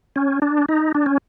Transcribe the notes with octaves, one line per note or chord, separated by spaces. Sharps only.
C#4
D4
D#4
D4
C#4